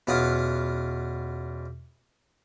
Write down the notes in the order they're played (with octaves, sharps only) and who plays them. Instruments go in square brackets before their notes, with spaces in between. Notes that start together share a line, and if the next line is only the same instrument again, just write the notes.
[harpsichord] E2 B2 C#4 F4 F5 D#6